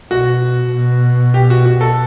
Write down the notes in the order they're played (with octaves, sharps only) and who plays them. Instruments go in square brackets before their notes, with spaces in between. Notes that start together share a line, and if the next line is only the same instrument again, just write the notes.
[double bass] B2 [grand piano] F#4
[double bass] B2
[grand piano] G4
F#4
F#4
A4